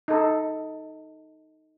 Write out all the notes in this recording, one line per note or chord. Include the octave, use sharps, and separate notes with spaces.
D#4 A4